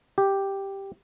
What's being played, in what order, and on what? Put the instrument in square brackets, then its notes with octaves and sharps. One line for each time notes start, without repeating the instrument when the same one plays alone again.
[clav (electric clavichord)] G4